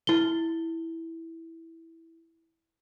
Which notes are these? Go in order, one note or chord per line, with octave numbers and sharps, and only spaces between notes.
E4 G7